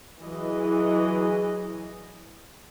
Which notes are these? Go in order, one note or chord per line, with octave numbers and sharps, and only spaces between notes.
E3 F#3 G#4 D#5